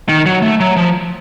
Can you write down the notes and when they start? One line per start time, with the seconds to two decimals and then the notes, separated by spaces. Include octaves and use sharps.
0.09 D#3
0.26 F#3
0.42 A3
0.60 F#3
0.77 F3